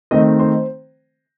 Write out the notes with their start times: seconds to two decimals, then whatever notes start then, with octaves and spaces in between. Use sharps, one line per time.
0.11 D#3 A3 C4 D#5
0.40 C5